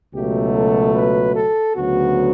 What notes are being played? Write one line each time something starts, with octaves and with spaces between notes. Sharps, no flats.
C#2 B2 F#3 A3 G4
A4
B4
A4
D2 C#3 F#3 B3 F#4